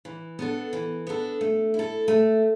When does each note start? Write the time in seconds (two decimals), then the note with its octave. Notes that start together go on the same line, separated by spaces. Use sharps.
0.05 E3
0.39 B3 D4 A4
0.73 E3
1.07 B3 D4 A4
1.41 A3
1.74 E4 A4
2.08 A3